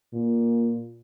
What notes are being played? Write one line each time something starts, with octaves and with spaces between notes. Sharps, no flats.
A#2